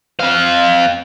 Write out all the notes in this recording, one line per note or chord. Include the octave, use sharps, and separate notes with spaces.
C4 F5